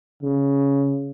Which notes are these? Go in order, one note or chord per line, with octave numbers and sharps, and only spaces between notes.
C#3